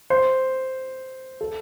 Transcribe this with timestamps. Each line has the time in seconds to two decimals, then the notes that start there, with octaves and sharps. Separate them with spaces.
0.10 C5
1.41 A4